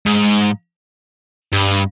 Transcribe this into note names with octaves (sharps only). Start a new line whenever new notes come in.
G#2
G2